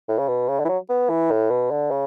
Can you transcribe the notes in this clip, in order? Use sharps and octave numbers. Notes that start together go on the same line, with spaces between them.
A2
C#3
B2
C#3
D3
E3
F#3
B3
E3
A2
B2
D3
C#3